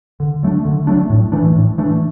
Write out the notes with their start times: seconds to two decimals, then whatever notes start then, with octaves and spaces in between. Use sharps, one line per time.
0.20 D3
0.43 F#3 A3 D4
0.65 D3
0.87 F#3 A3 D4
1.10 A2
1.32 E3 A3 D4
1.56 A2
1.78 E3 A3 D4